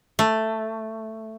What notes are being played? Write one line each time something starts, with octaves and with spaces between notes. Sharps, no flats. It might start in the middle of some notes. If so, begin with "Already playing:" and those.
A3